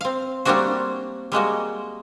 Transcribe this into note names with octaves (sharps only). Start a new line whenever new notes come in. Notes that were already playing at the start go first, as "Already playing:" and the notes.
C4 F5
G3 A3 A#3 C4 D4 F#4
G3 G#3 A#3 F#4